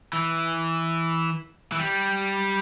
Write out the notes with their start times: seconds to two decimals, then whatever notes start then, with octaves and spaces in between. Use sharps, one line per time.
0.13 E3
1.72 E3
1.79 G3